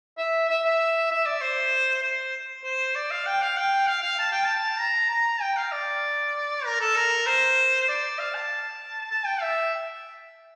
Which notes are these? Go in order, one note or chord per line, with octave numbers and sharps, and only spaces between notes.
E5
E5
E5
E5
D5
C5
C5
C5
D5
F5
G5
F5
G5
F5
F5
A5
G5
A5
A#5
A#5
G5
F5
D5
A#4
A4
A#4
C5
D5
F5
A5
A5
G5
E5